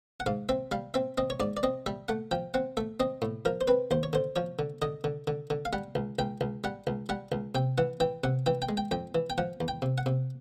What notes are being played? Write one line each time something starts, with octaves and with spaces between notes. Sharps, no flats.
F#5
G#2 F5
C4 E5
G3 F5
C4 E5
C4 D#5
C#5
G#2 D5
D5
C4 D#5
G3 E5
A3 F#5
F3 G5
C4 F#5
A3 E5
C4 D#5
A2
F3 A#4
C5
C4 B4
D#2 C5
C#5
D3 C5
F3 C#5
D3
D3 D#5
D3
D3
D3
F5
G3 F#5
C#2
C#2 G5
C#2
G3 F#5
C#2
G3 F#5
C#2
C3 G5
E3 F#5
E3 G5
C3 F#5
E3 G5
G5
G#3
G5
F2 G5
E3
G5
F3 F#5
E2
G5
C3
F#5
C3